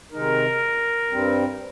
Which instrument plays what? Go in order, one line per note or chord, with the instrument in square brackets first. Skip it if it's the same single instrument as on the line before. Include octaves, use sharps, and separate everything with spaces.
[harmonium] C3 D#3 G#3 D#4 [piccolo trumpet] A#4
[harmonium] G2 G3 C4